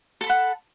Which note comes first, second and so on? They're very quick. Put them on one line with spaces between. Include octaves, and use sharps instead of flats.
A4 A5 B5 F#5